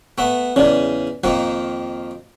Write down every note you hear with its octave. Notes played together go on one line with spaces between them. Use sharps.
A3 B3
E2 C#3 C#4 D5
F2 D#3 A#3